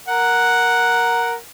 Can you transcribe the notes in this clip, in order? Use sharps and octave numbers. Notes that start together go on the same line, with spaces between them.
A#4 F#5